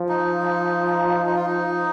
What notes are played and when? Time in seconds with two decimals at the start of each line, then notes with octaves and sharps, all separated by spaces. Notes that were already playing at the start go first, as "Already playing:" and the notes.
Already playing: F3
0.09 D#4
1.26 D#4
1.36 F4
1.46 D#4